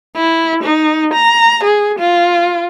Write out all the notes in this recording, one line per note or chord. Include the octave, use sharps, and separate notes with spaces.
E4
D#4
A#5
G#4
F4